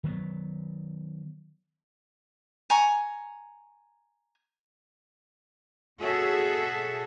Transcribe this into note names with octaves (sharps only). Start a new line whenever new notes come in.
D#3 F#3 G3 B3
G#5 A#5 C#6
B2 F#4 G#4 A4 C#5 E5